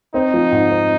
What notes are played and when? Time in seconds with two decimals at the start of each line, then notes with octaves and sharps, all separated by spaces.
0.14 C4 D#4
0.34 F3
0.52 G#2
0.70 C4